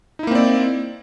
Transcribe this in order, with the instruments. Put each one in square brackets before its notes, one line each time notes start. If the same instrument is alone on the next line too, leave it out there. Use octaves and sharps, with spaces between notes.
[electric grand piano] D#4
E4
A#3
C4
D5